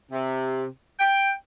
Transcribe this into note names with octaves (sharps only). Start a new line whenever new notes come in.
C3
G5